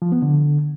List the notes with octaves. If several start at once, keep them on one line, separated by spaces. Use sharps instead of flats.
F3
B3
D3